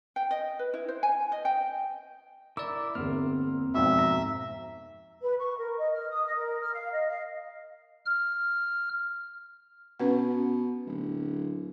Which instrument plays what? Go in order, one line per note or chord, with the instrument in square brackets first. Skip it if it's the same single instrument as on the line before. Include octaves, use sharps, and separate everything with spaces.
[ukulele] G5
D#5
B4
E4
C5
G#5
D#5
G5
[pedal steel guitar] E4 A#4 D6 [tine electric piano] D5 E6
[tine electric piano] G1 E2 F6 [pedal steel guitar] A#3 C4
[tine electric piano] F2 G#2 B2 [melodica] E5
[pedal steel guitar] A#5
[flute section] B4
C#6
A#4
D#5
F6
D#6
D#5
A#4
F6
F5
D#5
F5
[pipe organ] F6
[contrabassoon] B2 [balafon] C#4 B4 F#5
[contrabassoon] D1